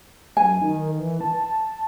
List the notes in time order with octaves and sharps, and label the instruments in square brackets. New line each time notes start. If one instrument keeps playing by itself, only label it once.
[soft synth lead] F#2 [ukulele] G#5
[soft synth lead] D#3
E3
A5